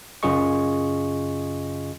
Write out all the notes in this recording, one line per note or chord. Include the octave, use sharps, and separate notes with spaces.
F#2 C#3 F4 G#4 D#5 C#6